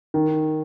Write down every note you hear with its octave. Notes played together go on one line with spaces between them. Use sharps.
D#3